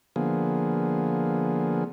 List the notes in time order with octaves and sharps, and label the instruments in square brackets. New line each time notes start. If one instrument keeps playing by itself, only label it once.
[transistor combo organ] D3 F3 A#3 B3 G#4